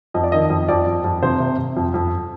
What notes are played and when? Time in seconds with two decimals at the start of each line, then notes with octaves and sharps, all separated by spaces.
0.14 F2 D#5
0.24 D5
0.32 D#3 D#5
0.50 F2
0.68 F2 D5
0.87 F2
1.04 F2
1.23 C3 C5
1.40 C3
1.58 C3
1.77 F2
1.94 F2